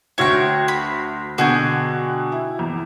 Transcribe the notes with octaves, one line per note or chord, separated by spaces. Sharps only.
D2 F#4 C#5 E5 G5
B5
B2 D3 F#4 G#4 G5
E4
E2